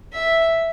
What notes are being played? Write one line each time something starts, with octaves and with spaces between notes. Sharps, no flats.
E5